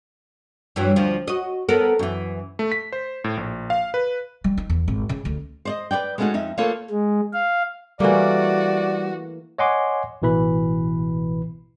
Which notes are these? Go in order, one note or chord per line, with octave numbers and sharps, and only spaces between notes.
G2 E3 F#3
D2 F3
F#4 D#5
B3 A4 A#4
F#2 E3
A3
B6
C5
A2
A#1
F5
B4
G3
D#4
E2
G#1
C#3
D2
C5 D5 D#5
B4 C#5 D5 G5
G#3 A3 B3 C#4 D#4 F#4
F2 D#4 E5
A3 A#3 F4 A4 B4 C#5
G#3
F5
E3 G3 A3 A#3 F#4 D5
C#5 D#5 F#5 G#5 C6 D6
A1 B2 E3 B4 B5